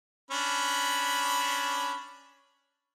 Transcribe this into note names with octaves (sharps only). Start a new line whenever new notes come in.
C#4 D4 B5